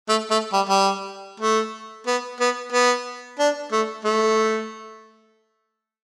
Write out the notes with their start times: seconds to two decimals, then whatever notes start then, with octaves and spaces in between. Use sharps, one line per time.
0.09 A3
0.31 A3
0.53 G3
0.69 G3
1.40 A3
2.07 B3
2.40 B3
2.73 B3
3.39 D4
3.72 A3
4.05 A3